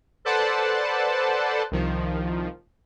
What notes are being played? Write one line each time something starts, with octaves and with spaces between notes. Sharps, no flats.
A4 B4 C5 D5 F#5 A5
C2 D#3 F3